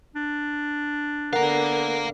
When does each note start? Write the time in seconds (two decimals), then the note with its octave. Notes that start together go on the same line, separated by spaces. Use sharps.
0.15 D4
1.33 D3 B3 A#4 F5 F#5 A#5